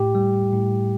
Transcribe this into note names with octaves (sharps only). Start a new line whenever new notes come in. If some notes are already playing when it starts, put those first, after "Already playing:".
Already playing: A2 G4
G3
A2